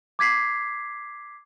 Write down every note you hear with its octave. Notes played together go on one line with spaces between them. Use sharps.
D6 G#6 B6 C7